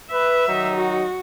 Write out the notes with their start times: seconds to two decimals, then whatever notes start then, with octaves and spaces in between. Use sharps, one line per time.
0.12 B4 E5
0.47 D#3 F#3 D#4
0.76 F#4